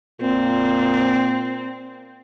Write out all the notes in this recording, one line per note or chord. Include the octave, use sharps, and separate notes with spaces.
A#2 C4